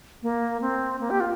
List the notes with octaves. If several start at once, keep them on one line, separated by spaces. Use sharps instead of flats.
A#3
C4
A#3
G4
F4